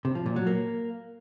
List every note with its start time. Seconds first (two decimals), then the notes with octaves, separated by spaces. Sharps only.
0.05 C3
0.15 F3
0.26 A#2
0.36 F#3
0.47 A#3